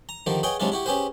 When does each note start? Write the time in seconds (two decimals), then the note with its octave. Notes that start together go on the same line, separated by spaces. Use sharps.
0.09 A#5
0.26 D3 D#3 F3 G4
0.43 G#4 B4 C#5 D#5 F#5 G5
0.60 C3 F#3 G#3 D4 D#4 F4
0.72 E4 F#4 G4
0.86 C#4 G4 G#4 B4 C5